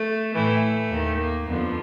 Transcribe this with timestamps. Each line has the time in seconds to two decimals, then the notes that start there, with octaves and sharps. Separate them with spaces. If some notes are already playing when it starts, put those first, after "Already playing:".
Already playing: A3
0.35 A2 E3 A3
0.91 D#2 D#3
1.20 A#3
1.48 F2 D3 F3 A3 B3